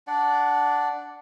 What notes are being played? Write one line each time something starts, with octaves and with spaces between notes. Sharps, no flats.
D4 D5 F#5